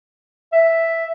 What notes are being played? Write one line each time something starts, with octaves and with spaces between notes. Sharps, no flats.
E5